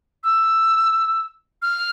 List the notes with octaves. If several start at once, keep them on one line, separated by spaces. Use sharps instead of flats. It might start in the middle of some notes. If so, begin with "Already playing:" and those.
E6
F6